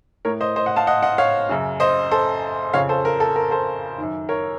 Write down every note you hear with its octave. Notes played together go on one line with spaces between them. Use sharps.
A2 A#4 C#5
C5 D#5
C5 D#5
D#5 F#5
F5 A5
D#5 F#5
D#5 F#5
C#5 F5
F#2 C#3
C5 D#5
A4 C5
F2 C#3 C#5 F5
A4 C5
A#4
A4
A#4
A4 C5
F#2 D#3
A#4 C#5